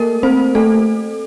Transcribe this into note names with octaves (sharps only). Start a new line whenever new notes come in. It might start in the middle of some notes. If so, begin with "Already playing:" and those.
Already playing: A3 A#3 A4 A#4
C4 C5
A3 A4